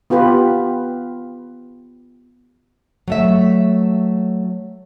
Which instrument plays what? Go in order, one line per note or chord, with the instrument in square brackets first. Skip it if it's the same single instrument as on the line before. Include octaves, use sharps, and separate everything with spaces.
[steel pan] B3 F4 G4 B4
[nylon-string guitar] F#3 A3 E5